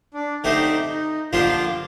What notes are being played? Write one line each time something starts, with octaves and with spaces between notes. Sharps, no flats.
D4
D3 A3 C4 D#4 G4
D#4
D3 F3 A#3 D4 F4 G4